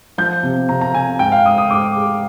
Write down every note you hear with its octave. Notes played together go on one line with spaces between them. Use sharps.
F3 G6
C3
C3 A#5
A#5
C3 G#5
G#2 G5
F5
G#2 D#6
D#6
G#2 D6
G#3